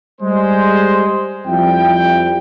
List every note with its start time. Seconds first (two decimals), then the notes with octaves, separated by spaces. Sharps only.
0.21 G3 G#3 C5
1.46 F2 F3 G3 E4 G5